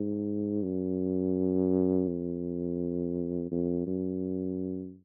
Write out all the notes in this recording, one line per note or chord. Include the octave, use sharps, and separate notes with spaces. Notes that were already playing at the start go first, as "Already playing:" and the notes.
Already playing: G#2
F#2
F2
F2
F#2